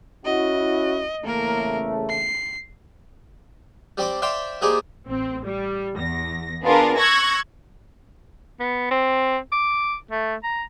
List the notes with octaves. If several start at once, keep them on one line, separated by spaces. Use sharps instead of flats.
C#4 E4 F#4 D#5
E2 C#3 A3 A#3 A#4
C7
G3 C4 D5 C6 D6
C5 D5 E5 F5 G5 C6
G3 A#3 D#4 G#4 C5 D5
A1 C4
G3
E2 A#6
B3 D4 F4 G#4 A#4
C#6 E6 F#6 G#6 A#6
B3
C4
D6
A3
A#5